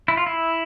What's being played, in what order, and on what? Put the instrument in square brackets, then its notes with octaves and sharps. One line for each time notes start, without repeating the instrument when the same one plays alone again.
[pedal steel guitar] E4
F4
E4